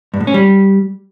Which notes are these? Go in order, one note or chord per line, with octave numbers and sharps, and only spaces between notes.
G2
A2
C#4
G3